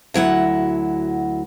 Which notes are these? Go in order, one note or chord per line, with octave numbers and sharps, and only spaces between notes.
D2 F#3 E4 F#5